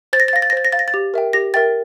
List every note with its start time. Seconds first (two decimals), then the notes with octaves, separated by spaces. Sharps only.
0.13 C5 A6
0.20 A#6
0.28 A6
0.33 F5 A#6
0.42 A6
0.50 A#6
0.53 C5 A6
0.65 A#6
0.72 F5 A6
0.79 A#6
0.88 A6
0.94 G4
1.14 A#4 E5 G5
1.33 G4 A#6
1.54 A#4 E5 G5 A6